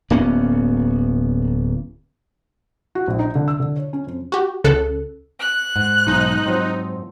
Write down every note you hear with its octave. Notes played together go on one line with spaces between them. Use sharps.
D1 A#3 B3 C#4
F#4
A#1
D#4
D3
E6
D3
C#5
C#4
F2
F#4 G4
C#2 C#3 A4 F#6
F#6
G#2 F#5
B1 D#4 C5
F3 F#3 C4